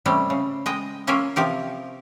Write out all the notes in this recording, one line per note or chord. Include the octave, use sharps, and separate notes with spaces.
C3 G3 A3 C#4
C#3
G#3 D#5 G5
A#3 C#4 F4 A#4 E5
C3 F3 G4 A#4